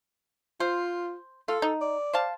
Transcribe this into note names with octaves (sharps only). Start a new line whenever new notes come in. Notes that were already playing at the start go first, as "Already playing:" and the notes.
F4 C5
F4 A4
D#4
D5
C5 F5 A5